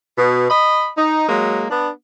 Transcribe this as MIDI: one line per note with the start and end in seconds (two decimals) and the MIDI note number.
0.18 0.49 47
0.50 0.88 75
0.50 0.88 83
0.96 1.28 63
1.28 1.65 54
1.28 1.65 56
1.28 1.65 58
1.70 1.89 59
1.70 1.89 62